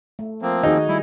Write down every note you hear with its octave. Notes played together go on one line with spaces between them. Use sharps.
A3
F3 A#3 C4
D#3 D#4 F#4 G#4
G3 E4